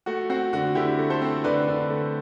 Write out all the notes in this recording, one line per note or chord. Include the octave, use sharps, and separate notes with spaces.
A3 F#4
C4 F#4
D3 F#4
D3 E4 G4
A3
A4 C5
C4
D3 B4 D5
D3
A3